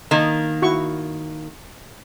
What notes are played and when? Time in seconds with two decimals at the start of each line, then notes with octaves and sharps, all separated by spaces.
0.11 D#3 A#3
0.62 E4 F#4 C#6